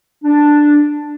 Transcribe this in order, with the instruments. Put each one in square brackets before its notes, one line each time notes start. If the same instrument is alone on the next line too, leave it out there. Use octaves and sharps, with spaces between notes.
[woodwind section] D4